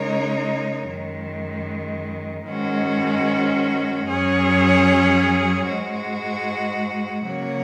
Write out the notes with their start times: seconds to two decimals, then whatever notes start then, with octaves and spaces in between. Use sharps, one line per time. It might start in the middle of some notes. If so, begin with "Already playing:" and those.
Already playing: C#3 G#3 D#4 A#4 C#5
0.88 F#2 D#3 G#3
2.47 G#2 D#3 G#3 C#4 F#4
4.07 F#2 F#3 C#4 G#4 C#5
5.66 G#2 G#3 F#4
7.27 C#3 F#3 A#3 F#4 C#5